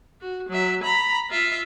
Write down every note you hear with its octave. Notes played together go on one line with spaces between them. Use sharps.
F#4
F#3 E5
A#5 B5
F4 E5